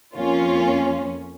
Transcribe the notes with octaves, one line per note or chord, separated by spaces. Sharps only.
F2 F3 A#3 C#4 F4